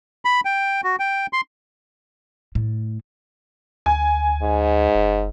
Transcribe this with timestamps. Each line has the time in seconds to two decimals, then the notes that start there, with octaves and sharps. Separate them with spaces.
0.25 B5
0.45 G5
0.84 F#4
1.00 G5
1.33 C6
2.55 A2
3.86 D2 G#5
4.42 G#2
4.95 F#1